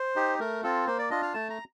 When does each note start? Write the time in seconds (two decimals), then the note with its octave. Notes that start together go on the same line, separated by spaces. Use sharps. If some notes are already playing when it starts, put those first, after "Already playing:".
Already playing: C5
0.16 D#4 G4
0.40 A3 A#4
0.63 C4 F4 A4
0.87 A#3 C5
0.99 D5
1.10 D4 F4 D#5
1.22 F5
1.34 A3 A5
1.50 A#5